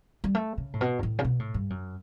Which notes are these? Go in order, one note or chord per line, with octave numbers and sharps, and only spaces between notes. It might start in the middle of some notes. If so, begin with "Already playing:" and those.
G3
A3
C#3
A2
B2
G2
A2
C#3
B2
A2
G2
F#2